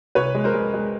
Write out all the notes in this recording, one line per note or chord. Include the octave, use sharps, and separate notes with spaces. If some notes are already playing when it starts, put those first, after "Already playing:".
C2 B4 C#5
G#3
A#4 C5
G#3
G#3